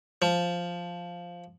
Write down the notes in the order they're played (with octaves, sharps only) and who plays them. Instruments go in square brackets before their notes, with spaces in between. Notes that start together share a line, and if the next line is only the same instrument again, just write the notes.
[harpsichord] F3